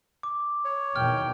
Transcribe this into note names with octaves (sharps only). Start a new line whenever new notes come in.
D6
C#5
E2 B2 D#3 G5 F6